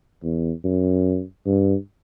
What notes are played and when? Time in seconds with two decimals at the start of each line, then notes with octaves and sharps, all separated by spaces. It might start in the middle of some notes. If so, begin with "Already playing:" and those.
0.23 E2
0.64 F#2
1.46 G2